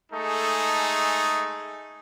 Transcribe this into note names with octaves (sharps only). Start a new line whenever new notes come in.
G#3 A3 D#4 G#4 A4